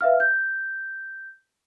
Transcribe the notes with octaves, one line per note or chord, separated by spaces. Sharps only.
B4 E5 F5 F6
G6